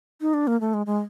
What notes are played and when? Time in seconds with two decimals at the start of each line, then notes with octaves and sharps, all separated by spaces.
0.21 D#4
0.34 D4
0.47 A#3
0.61 A3
0.74 G#3
0.86 G#3